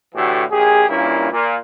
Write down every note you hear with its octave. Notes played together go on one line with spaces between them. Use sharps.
A2 D3 E3 F#4 G4
A#1 G4 G#4
G2 A#2 A#3 C#4 E4
A#2